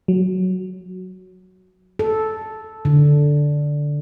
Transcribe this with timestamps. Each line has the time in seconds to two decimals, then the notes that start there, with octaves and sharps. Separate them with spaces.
0.08 F#3
1.99 A4
2.85 D3